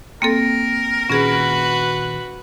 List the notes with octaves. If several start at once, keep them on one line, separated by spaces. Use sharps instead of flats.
A#3 C4 A4 A#4 G5
A#2 D#3 C#4 F#4 G#4 B4